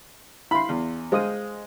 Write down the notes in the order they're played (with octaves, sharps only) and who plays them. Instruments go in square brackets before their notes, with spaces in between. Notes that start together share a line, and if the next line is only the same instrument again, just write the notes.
[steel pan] E4 F5 C6 [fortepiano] B5
[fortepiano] E2
[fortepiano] G#3 [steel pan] C5 F5 D#6